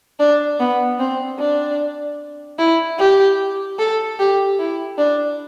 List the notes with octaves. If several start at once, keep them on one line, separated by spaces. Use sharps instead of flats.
D4
B3
C4
D4
E4
G4
A4
G4
E4
D4